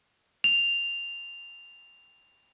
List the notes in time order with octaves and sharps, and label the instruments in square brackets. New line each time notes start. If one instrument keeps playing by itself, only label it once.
[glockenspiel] F7